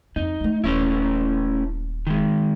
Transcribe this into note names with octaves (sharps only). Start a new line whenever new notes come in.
F2 A#3 D#4
G#3 A3
D#1 A3 C#4 E4
D#3 G#3